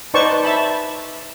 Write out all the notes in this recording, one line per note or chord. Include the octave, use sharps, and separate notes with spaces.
D#4 B4 C5 D5 A5 C#6
E5 A5 B5